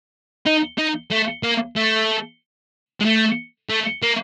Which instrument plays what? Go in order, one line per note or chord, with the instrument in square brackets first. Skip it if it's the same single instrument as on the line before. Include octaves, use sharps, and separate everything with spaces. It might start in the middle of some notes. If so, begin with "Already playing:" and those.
[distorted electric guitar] D#4
D#4
A3
A#3
A3
G#3
A3
A3
A#3